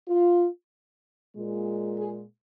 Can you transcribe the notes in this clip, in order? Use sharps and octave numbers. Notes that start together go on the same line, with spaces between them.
F4
A#2 G#3
G#4